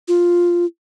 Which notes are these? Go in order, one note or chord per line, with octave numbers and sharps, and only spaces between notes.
F4